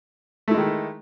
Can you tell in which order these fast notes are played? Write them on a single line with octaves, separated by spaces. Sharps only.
A3 E4 G#3 D#3